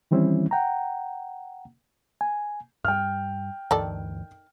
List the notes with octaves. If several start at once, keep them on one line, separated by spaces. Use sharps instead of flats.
D#3 E3 G3 C4 C#4 E4
F#5 G5 A#5
G#5
G2 G3 G5 F6
D2 G2 D#3 E3 A4 D5